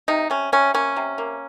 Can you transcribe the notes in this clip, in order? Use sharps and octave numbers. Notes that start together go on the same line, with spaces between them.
C3 D#4
C3 C#4
C3 C#4
A#3 C#4
C3
A#3